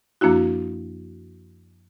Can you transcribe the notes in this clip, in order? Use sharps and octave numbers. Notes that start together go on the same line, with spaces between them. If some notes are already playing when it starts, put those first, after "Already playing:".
F#2 F3 A#3 D4 E4 F#4